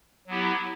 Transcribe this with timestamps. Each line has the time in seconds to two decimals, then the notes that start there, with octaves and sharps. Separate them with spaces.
0.27 F#3 B3 E4 G4